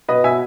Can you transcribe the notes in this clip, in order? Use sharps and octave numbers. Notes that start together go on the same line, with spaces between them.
B2 B4 D#5
B2 E5 G#5